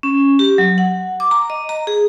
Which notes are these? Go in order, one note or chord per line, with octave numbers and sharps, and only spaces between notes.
C#4
G4
F#3
F#5
D6
A#5
D#5
A#5
G#4